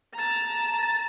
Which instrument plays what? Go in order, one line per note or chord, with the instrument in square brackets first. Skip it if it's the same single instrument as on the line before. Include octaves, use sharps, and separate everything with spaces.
[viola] A5 A#5